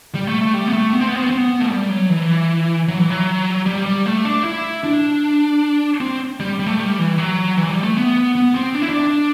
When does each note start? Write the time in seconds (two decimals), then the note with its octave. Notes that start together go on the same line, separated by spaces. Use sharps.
0.15 G3
0.27 A3
0.41 A3
0.54 G3
0.67 B3
0.73 A3
0.93 B3
1.00 C4
1.08 B3
1.16 C4
1.23 B3
1.30 C4
1.38 B3
1.60 A3
1.70 G3
1.90 F#3
2.09 E3
2.88 F#3
2.99 E3
3.10 F#3
3.66 G3
3.86 G3
4.06 A3
4.25 D4
4.44 E4
4.84 D4
6.01 C4
6.40 G3
6.59 G3
6.66 A3
6.79 G3
6.99 E3
7.18 F#3
7.57 E3
7.70 G3
7.83 A3
7.97 B3
8.35 B3
8.55 C4
8.75 D4
8.82 E4
8.89 D4